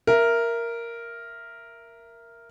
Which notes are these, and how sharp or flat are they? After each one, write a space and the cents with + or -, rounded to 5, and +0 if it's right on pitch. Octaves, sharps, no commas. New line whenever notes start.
A#4 +0 E5 +15